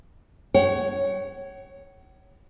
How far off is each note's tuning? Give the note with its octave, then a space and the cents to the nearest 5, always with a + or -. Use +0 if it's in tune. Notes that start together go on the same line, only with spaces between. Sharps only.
C#5 +0 F#5 +45